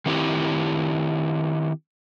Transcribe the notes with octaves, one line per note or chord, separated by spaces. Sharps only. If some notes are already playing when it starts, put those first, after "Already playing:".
D#3 C4 E4 G4